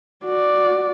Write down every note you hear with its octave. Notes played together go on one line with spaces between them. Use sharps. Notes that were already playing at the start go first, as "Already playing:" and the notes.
F#4 D5